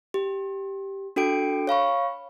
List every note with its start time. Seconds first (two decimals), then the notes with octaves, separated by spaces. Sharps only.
0.14 G4
1.16 D4 F#4 A4 G5 D7
1.67 C#5 F5 B5 C#6